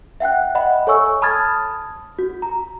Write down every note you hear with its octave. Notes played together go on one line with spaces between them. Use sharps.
E5 F#5 G5 F#6
D#5 E5 F#5 B5
A4 C#5 G#5 C#6 E6
A5 B5 D#6 F6 G#6 A6
F#4
A#5